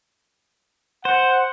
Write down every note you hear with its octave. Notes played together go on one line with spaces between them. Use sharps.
C5 F#5